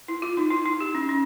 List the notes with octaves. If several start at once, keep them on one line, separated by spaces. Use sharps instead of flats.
E4
F4
D#4
E4
E4
G4
C#4
C#4